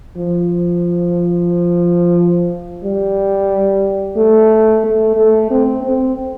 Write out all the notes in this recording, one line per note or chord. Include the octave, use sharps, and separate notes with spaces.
F3
G3
A3
A3
A3
C4
C4